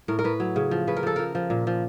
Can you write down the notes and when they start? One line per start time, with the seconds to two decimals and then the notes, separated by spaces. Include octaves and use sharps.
0.08 A2 A#4
0.19 A#4
0.24 A2 B4
0.40 F#3
0.56 C#3
0.71 F3
0.87 C#3 B4
0.97 A#4
1.03 F3 A4
1.16 F3 A#4
1.35 F3
1.50 A#2
1.67 F3